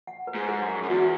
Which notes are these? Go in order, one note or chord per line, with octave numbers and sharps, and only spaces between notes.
F#5
B4
G#2
G#4
F#2
F#5
F#2
E2 F#4